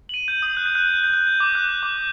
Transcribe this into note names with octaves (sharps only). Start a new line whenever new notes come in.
F#7
D#7
G6
D#6
F#6
G6
F#6
G6
F#6
G6
F#6
G6
D6
F#6
F#6
D6